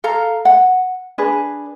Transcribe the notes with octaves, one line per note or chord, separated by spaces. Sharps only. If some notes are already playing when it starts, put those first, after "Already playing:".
A4 F5 A#5
F#5
D4 G#4 B4